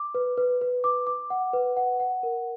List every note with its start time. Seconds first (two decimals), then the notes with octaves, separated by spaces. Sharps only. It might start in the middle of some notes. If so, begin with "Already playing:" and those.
Already playing: D6
0.15 B4
0.37 B4
0.61 B4
0.84 D6
1.07 D6
1.30 F#5
1.53 B4
1.77 F#5
2.00 F#5
2.23 A#4